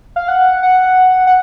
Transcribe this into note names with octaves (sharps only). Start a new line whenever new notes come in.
F5
F#5
F#5
F#5